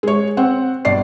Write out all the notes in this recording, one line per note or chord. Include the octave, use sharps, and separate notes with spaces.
G#3 C#5
C4 F#5
G1 D5 C7